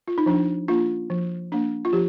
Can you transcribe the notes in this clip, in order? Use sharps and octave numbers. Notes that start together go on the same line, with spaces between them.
F4
D#4
F3 D4
A#3 D4 F4
F3
A#3 D4
F4
F3 G4